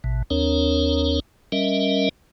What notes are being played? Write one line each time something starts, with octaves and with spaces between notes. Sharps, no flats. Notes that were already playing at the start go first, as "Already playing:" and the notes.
A1 B2
D#2 C4 D4 A#4 C#5
G3 C#4 A#4 D#5 E5